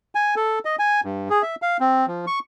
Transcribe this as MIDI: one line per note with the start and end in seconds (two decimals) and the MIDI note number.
0.15 0.35 80
0.36 0.59 69
0.65 0.76 75
0.79 1.01 80
1.04 1.28 43
1.30 1.42 68
1.42 1.55 76
1.62 1.77 77
1.80 2.06 60
2.07 2.25 53
2.27 2.39 85